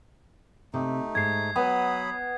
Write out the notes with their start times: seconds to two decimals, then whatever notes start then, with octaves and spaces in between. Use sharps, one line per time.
0.74 C3 A3 D#4
1.15 G#2 G#6 C7
1.56 F#3 B3 G#5 B5 D#6